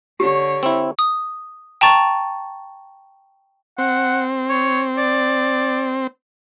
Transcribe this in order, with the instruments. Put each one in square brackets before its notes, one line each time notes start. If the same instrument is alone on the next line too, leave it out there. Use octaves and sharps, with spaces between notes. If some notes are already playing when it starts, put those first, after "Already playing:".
[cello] D3 C#5 [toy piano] G4
[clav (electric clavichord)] C4 E4
[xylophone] D#6
G5 A5 A#5 C#6 A6
[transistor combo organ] C4 [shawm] F#5
[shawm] C#5
D5